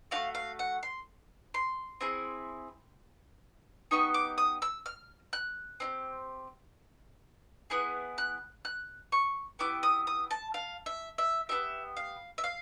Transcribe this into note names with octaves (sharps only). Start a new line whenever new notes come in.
A3 D4 F#4 F5
F5
F#5
C6
C6
C4 E4 G#4
B3 D#4 G4 C#6
D6
D#6
E6
F6
F#6
C4 D#4 G4
B3 E4 G#4 F#6
F#6
F#6
C#6
B3 E4 G4 D6
D#6
D#6
A5
F5
E5
E5
B3 D#4 G4 E5
F5
E5
F5